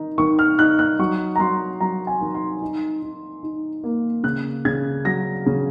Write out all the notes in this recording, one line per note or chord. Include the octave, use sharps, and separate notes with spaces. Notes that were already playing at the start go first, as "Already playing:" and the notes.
Already playing: D#3 D#4
D#3 C#6
F6
D#4 F#6
F#6
F#3 C#6
A#5
F#3 C6
F#3 A#5
G#5
D#3
C6
D#4
D#4
D#4
A#3
C#3 F#6
C#3 G#6
F#3 A#6
C#3